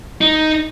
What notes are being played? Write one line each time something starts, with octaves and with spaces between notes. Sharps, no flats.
D#4